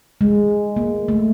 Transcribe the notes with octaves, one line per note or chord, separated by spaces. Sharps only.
G#3
A#3
A3